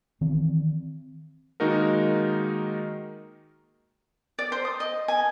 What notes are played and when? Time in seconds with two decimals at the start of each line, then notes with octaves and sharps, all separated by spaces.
0.21 D#3 E3 C4
1.60 D#3 G#3 A#3 D#4 F#4 A#4
4.39 D5
4.52 C5
4.65 D#6
4.80 D#5
5.08 G#5